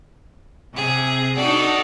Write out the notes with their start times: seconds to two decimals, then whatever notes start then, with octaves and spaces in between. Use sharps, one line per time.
0.72 C3 G#4
1.38 D4 D#4 F#4 A4 D5